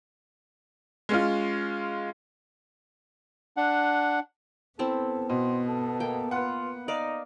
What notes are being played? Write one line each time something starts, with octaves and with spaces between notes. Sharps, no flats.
G#3 C#4 F4
D4 F#5
B3 C4 E4 A4 A5
B2 C5
A4
A#3 G5
F4 B4 F#5
D#4 D5 F5